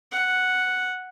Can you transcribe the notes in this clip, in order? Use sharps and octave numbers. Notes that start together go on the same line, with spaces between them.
F#5